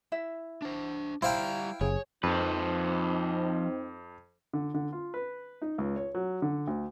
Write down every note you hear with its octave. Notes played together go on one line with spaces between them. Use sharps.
E4 E5
D4 C5
G3 E4 C5 F5 G5 A#5
F#1 G#4 C#5
F2 F3 C4 D#4 B4
D3
D3
F4
B4
D#4
C#2
C#5
F#3
D3
D2